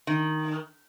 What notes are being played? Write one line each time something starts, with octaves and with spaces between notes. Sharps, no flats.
D#3